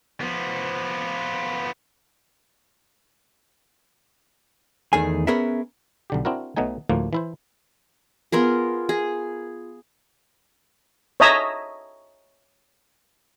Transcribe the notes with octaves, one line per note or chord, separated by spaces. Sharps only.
F3 B3
E2 D#3 A3 G#4 G#5
B3 C#4 G#4 A#4 B4 E5
B1 D3 G4
C4 D4 E4 F#4 A#4
B1 B2 F#3 A3 D#4 G#5
D2 A2 F3 A#3
E3 E4 C5
B3 F4 G#4 A#4
G#4
C#5 D#5 E5 A5 A#5 D#6